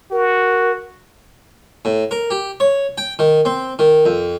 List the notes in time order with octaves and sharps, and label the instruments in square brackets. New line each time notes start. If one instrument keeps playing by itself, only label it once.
[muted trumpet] F#4 [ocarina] A#4
[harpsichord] A2
A#4
G4
C#5
G5
D#3
C4
D#3
F2